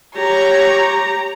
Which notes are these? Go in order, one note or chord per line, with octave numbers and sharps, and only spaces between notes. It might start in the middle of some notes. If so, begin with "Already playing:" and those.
G4 C#5 A#5